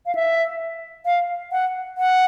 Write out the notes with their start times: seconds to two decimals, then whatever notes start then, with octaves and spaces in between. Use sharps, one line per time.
0.06 F5
0.15 E5
1.06 F5
1.52 F#5
1.98 F#5